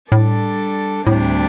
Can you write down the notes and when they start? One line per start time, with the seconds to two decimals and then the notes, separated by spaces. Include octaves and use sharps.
0.12 A2 G3 D4 A4
1.07 D2 A2 C3 G3 D4